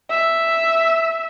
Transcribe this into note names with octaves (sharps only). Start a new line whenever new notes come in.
E5